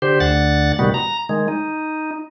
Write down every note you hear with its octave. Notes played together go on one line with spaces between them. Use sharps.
D3 G4 C5
D2 D3 F#5 A6
A2 C3 D#3 G3 B3 F#4
A#5
D#3 G#3
D#4